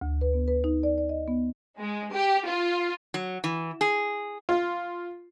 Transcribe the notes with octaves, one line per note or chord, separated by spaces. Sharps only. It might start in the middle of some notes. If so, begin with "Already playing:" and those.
D2
B4
B3
B4
D#4
D5
D5
D#5
B3
G#3
G4
F4
F#3
E3
G#4
F4